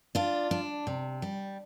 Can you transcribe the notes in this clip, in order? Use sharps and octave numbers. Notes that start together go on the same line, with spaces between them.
D4 F4
D4
C3
G3